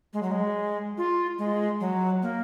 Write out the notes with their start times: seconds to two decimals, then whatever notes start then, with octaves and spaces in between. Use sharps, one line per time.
0.13 G#3
0.23 F#3
0.31 G#3
0.98 F4
1.39 G#3
1.80 F#3
2.22 A#3